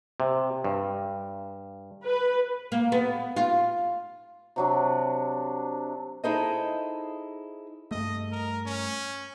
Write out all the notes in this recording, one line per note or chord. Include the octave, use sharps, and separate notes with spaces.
C3
G2
B4
A#3
B3
F4
C3 F#3 D4
D#4 E4 G#4 A4 C5 D#5
G2 A3 D#5
A#4
C#4